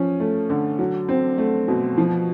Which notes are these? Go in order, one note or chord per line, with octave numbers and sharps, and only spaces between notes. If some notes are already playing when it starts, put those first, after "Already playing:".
Already playing: F3 C#4
A3
D3
F#3
C4
A3
B2
F3